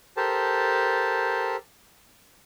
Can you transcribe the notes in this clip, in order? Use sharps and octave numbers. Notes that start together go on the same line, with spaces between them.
G4 A4 A#4 C5 A5